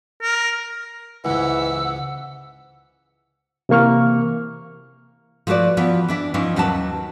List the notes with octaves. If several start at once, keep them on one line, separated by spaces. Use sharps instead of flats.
A#4
C#2 G#2 E3 F#5 E6
C3 E3 A#3 C#6 F6
F3 A3 F#4 B4 D5
E3 F3 B3
E3 D4 E5
E3 F3 C#4 D#4
D#2 F#3 B4 A5